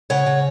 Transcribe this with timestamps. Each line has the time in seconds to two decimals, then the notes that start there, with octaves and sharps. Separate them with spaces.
0.10 C#3 C#5 F#5
0.26 C#3